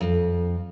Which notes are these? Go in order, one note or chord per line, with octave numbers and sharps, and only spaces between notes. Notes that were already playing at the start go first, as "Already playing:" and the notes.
F2